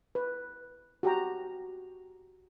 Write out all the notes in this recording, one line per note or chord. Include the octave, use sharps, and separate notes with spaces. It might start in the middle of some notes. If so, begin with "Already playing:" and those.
B4
F#4 G4 G5 A#5